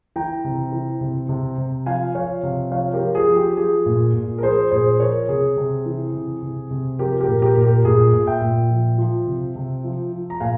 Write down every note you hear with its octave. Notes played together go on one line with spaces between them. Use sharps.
E3 G5 A#5
C3
E3
C3
C3
C3
F3 F5 G#5
F3 C#5 F5
C3
F3 C#5 F5
G4 A#4
F3
G#4
F3
G4
F3 G#4
A#2
A#2
A#4
F3 G#4 C5
A#2 G#4 C5
F3 A#4 C#5
C3 G#4
C3
E3
C3
C3
C3
F3 G4 A#4
G4 A#4
A#2
G4 A#4
A#2
G4 A#4
A#2 G#4
A#2
E5 G5
A#2
F3
F3
C3
C3
F3
F3
A#5
A#2 F5 G#5